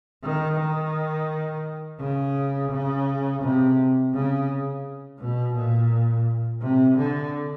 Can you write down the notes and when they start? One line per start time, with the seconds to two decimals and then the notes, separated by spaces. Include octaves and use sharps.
0.24 D#3
0.59 D#3
2.00 C#3
2.71 C#3
3.43 C3
4.14 C#3
5.20 B2
5.55 A#2
6.61 C3
6.98 D3